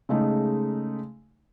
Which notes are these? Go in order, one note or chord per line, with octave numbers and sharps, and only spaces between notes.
C#3 G#3 A3 D#4